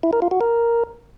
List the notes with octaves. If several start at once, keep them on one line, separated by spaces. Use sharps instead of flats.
E4
A#4
F4
F#4
A#4